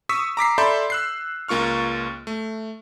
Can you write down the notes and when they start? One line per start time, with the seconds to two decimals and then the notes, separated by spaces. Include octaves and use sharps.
0.09 C#6 D#6 E6 B6
0.37 A#5 D6 B6 C7
0.58 A4 D5 E5 B5 C6 G6
0.90 E6 F#6 C7
1.48 C#2 A#3 F4 C#6 F6
2.27 A3